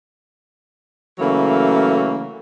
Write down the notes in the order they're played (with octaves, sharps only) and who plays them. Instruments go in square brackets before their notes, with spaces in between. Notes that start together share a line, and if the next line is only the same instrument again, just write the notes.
[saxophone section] C#3 E3 F#3 A3 A#3